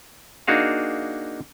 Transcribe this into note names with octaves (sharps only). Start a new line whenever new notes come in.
A#3 D4 D#4 F#4 G#4 F5